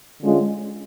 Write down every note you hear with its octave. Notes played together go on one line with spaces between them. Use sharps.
D3 G#3 C#4 F4